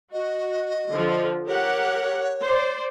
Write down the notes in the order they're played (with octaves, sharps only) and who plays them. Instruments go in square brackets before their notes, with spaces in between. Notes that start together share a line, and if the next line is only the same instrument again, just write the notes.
[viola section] F#4 [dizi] D#5
[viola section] D3 F3
[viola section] G4 A#4 F#5 [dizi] C#5
[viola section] C5 D5